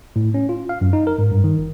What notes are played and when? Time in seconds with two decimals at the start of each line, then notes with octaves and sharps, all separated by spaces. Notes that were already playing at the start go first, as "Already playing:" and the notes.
0.16 A2
0.34 C#4
0.49 F4
0.69 F5
0.81 F#2
0.93 D#4
1.07 A#4
1.18 G#2
1.31 G2
1.44 D#3
1.58 G1